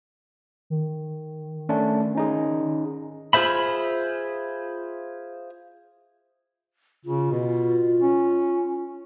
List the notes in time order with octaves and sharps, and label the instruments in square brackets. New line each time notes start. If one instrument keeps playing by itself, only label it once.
[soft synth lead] D#3
[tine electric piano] A3 C#4 D4
C#4 D#4 G#4
[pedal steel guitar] F4 G#4 C5 E5 B5
[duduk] C#3 [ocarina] F4
[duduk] B2
C#4